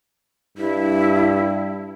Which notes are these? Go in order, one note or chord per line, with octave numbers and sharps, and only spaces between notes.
G2 E4